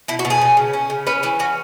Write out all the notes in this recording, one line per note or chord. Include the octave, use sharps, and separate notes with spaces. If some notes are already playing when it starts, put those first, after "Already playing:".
B2 E4
F#4
B2
G#4
C#4
C#3
C#4
C#3
C#4 B4
E3 B4
C#4 F#4